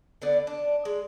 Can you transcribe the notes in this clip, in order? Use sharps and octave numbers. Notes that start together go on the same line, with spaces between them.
D3 B3 D5
D4
G#3